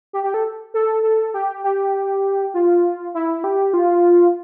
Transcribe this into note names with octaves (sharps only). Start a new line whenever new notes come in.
G4
G4
A4
A4
A4
G4
G4
F4
E4
G4
F4